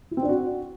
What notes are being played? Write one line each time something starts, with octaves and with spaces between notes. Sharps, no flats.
E4
C4
D4
F#4